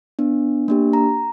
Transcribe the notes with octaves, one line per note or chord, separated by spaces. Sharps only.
B3 D4
A#3 D4 G4
A#5